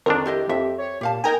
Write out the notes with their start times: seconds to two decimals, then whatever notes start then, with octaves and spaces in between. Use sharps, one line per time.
0.06 F2 D#3 D4 A#4
0.26 E4 G4 C5 D#5
0.49 F2 E5
0.78 C#5
1.01 A#2 G4 F5 A5
1.24 D#4 A#4 D#5 G5 G#5 A#5